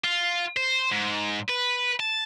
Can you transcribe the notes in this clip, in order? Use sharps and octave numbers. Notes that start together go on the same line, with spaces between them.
F4
C5
G#2
B4
A5